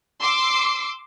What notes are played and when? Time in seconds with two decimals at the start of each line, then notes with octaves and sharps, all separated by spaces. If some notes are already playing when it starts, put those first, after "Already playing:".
0.22 C6 D6 E6 C7